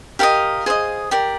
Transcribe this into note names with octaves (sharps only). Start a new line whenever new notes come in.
G4 A#4 D#5 F5
G#4 C5 D#5
G4 A#4 D5